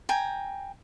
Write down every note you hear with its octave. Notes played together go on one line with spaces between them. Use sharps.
G5 G#5 A#5